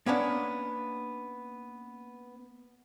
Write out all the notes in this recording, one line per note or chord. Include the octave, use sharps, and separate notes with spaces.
A#3 B3 C#4 D4